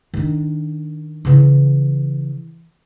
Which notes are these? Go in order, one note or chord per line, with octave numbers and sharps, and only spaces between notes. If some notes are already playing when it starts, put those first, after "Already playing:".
D#3 D4
C#3 E3